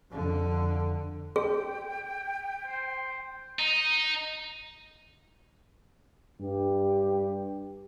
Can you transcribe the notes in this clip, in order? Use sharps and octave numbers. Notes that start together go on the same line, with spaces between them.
F2 D3
G#4 G5
C5
D#4
G2 G4